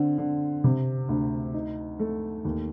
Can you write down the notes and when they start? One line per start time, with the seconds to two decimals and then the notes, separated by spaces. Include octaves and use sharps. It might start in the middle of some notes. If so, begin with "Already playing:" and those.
Already playing: D3 C4
0.18 D3
0.64 C3
1.09 D2
1.54 D#4
1.99 A3
2.45 D#2